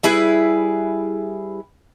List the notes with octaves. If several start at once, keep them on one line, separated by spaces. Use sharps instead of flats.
G3 E4 G#4 B4